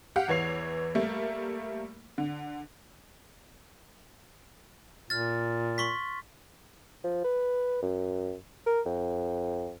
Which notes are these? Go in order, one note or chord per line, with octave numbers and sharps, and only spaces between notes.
G4 F5 F#5
E2 E3 C#5 C7 F7
G3 A3 A#3
D3
A#2 F6 A6
C6 C#6 B6
F3
B4
F#2
A#4
F2